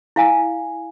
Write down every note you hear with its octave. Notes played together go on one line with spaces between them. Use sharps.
E4 F5 G#5